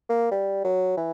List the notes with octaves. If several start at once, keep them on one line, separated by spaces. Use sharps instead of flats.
A#3
G3
F#3
E3